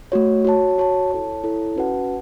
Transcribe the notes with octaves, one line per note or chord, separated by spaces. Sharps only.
A3 F#4 C#5
F#4 C#5 A5
F#4 C#5 A5
E4 A4 C#5 A5
E4 A4 C#5 A5
C#4 F#4 B4 F#5 A5